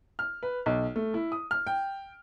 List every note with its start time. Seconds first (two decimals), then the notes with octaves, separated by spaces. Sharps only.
0.19 F6
0.43 B4
0.66 B1
0.96 A3
1.14 E4
1.32 D#6
1.51 F6
1.67 G5